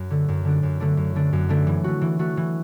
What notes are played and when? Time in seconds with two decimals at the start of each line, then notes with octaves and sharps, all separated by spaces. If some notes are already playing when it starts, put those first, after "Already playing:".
Already playing: F#2
0.11 D3 A3
0.28 F#2
0.45 D3 A3 D4
0.63 F#2
0.80 D3 A3 D4
0.97 F#2
1.15 D3 A3 D4
1.33 F#2
1.49 D3 A3 D4
1.67 E3
1.84 A3 F#4
2.01 E3
2.19 A3 F#4
2.37 E3